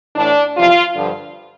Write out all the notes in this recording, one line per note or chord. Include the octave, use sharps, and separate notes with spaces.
A2 E3 D4
E2 C3 F3 F4
G2 D3 F3